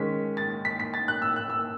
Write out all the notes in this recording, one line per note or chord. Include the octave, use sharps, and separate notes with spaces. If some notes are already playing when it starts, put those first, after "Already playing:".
Already playing: D#3 G#3 C#4 B6
A6
B6
B6
A6
F#6
E6
F#6
E6